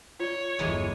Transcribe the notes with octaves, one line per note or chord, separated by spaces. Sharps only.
F4 C#5 D5
G1 E2 E3 F#3 G#3